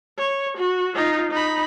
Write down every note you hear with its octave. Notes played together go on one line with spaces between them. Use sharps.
C#5
F#4
D#4 F4
D#4 B5